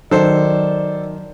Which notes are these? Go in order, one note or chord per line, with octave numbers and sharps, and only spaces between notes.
D#3 F#3 A4 C5 D5